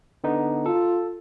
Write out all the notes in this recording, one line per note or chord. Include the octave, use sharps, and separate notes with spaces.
D3 B3 D#4
F4 A4